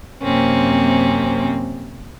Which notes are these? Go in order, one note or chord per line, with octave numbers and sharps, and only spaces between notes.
F#2 C3 A#3 C4 C#4